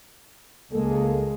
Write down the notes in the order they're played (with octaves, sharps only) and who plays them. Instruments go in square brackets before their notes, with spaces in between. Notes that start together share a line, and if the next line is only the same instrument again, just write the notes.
[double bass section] C#2 G#3 [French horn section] A#3 A4